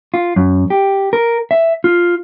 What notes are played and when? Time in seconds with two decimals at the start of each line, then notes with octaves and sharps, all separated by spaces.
0.14 F4
0.36 F#2
0.70 G4
1.13 A#4
1.51 E5
1.84 F4